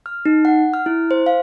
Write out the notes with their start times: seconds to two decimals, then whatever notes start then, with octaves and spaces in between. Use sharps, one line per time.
0.06 F6
0.26 D#4
0.45 F#5
0.74 F6
0.86 E4
1.11 C5
1.26 F5